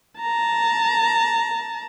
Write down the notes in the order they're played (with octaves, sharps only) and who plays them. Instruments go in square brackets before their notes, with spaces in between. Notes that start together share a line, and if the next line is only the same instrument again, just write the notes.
[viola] A5 A#5